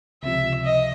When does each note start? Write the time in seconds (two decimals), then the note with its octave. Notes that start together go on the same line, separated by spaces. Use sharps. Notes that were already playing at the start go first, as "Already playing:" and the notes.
0.23 C#2 C3 F3 E5
0.64 D#5